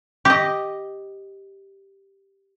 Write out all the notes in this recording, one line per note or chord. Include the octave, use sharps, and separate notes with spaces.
G4 D#5